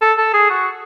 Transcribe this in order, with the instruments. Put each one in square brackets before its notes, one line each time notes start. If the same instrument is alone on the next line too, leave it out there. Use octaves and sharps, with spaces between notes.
[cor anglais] A4
A4
G#4
F#4